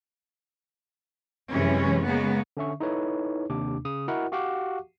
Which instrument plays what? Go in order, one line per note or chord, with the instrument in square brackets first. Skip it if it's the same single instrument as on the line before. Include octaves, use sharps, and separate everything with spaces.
[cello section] F#2 C3 E3 G#3 C#4
C#3 G#3 A#3 B3
[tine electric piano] D3 C#4 E5 C#6
D#4 E4 A4 B4 C#5
D#2 C3 D4 D6
C#3 D#6
E4 F#4 A#4 D#5 F#5
F#4 G4 F5 F#5 C#6 D6